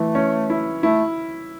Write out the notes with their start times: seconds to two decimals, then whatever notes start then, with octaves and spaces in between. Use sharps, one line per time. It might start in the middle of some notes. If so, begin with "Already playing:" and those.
Already playing: E3 A3
0.15 C#4
0.50 E4
0.83 A3 E4